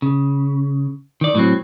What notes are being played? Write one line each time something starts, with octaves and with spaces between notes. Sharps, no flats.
C#3
D#3 D5
A2 F#3 C4